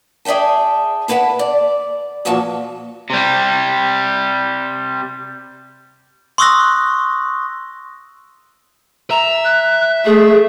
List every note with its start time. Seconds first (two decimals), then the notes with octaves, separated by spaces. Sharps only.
0.25 G#4 D5 E5 G5 A5
1.08 B3 E4 B4 F#5 A5
1.39 D5
2.25 E2 A#2 F3 F#4 A5
3.10 C3 G3
6.38 C6 C#6 D#6 E6 F#6 A#6
9.11 E5 A#5
9.44 F#6
10.05 A3 G#4